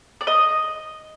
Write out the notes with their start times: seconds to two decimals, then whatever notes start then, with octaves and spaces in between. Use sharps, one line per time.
0.21 D5
0.27 D#5